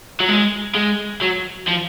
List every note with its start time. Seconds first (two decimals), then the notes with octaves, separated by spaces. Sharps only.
0.20 F#3
0.29 G#3
0.75 G#3
1.22 F#3
1.68 F3